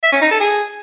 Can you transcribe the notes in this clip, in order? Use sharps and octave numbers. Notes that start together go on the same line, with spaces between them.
E5
C#4
D#4
A4
G#4